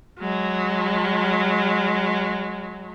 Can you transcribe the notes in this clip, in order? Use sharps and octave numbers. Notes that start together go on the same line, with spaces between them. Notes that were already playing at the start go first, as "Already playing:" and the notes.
F#3 G#3